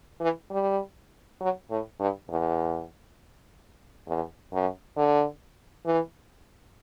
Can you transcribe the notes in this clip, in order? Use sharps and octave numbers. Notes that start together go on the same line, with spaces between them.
E3
G3
F#3
A2
G2
E2
E2
F#2
D3
E3